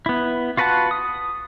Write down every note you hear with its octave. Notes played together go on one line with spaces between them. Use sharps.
B3 E4
F4 F#4 B4 F#5 A5
D#6